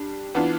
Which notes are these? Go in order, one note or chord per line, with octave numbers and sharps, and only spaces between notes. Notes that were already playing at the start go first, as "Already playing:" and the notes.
Already playing: G3 D4
E3 B3 D4 F4